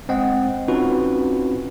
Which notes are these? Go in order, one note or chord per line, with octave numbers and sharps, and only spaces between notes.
G#3 C4 D#5 F#5
C4 C#4 D#4 F4 F#4 B4